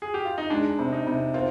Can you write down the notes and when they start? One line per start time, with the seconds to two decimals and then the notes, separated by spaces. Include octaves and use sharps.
0.02 G#4
0.14 G4
0.25 F4
0.38 D#4
0.50 G#3 D4
0.79 C3
0.92 D#4
1.07 C3
1.34 C4 F4